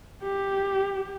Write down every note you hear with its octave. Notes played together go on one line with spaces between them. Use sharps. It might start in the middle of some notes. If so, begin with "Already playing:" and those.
G4